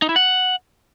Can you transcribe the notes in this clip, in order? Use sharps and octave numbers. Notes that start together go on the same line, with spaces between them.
D#4
E4
F#5